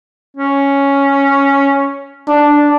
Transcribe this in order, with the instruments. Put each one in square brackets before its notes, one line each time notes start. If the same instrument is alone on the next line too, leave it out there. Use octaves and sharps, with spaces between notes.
[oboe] C#4
[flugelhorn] D4